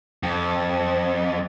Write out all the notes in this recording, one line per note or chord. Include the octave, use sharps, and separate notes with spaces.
F2